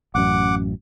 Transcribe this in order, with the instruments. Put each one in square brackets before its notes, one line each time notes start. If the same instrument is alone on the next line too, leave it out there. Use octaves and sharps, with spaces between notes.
[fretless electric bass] A1 F#2 [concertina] F#5 D6